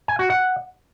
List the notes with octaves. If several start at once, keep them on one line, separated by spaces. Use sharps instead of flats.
G#5
F#4
F#5